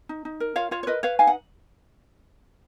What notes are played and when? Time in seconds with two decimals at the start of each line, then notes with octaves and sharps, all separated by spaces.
0.09 D#4
0.25 D#4
0.40 A#4
0.56 F4 C#5 F5
0.71 F4 C#5 F5
0.83 C#5
0.87 A#4 B4 D#5
1.03 B4 C#5 F5
1.19 D#4 F5 G#5
1.27 F#5